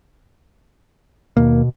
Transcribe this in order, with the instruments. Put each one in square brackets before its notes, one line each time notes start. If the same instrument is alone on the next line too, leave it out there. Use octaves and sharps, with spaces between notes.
[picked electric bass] D#2 A#3 [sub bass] B2